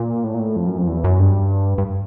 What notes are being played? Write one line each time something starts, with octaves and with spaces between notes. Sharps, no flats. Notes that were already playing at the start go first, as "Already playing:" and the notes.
Already playing: A#2
A2
A#2
A2
F2
F#2
F2
E2
F#2
G2
G2